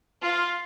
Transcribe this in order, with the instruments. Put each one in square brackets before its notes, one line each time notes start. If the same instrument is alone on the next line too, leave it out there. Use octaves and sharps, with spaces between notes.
[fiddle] F4